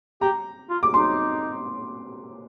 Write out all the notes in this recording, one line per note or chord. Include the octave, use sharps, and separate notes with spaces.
G4 A#5
F4
D6
D#4 C6